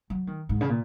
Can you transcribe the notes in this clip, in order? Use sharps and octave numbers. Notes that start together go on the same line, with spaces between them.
F#3
D#3
G#2
C#3
A#2